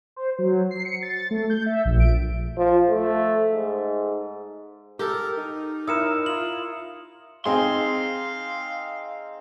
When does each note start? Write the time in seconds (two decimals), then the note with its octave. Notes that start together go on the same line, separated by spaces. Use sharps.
0.16 C5
0.39 F#3
0.71 C7
0.85 C#7
1.02 A6
1.31 A3
1.50 G6
1.66 E5
1.85 A#1
2.00 D7
2.58 F3
2.89 A3
3.53 G#2
4.99 G4 A4 A#4
5.37 D#4
5.87 E4 A#4 D#6 C#7 E7
6.26 F4 F#7
7.46 C4 D#4 G#4 F5 C6